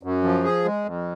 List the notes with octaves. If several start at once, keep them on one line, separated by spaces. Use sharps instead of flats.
F#2
F3
G#4
G#3
F2